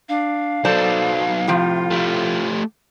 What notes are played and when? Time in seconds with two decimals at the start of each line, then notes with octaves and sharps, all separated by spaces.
0.09 D4 F5
0.65 F#3 D#4 A4 C5 D5 A5
1.47 A2 C3 F3 F4
1.90 A3 G4